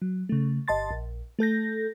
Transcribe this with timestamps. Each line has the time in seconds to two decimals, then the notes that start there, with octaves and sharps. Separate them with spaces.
0.02 F#3
0.29 C#3 A3
0.68 G1 D#5 A5 C6 A6
0.91 A#1
1.39 A3 A4 G6 A#6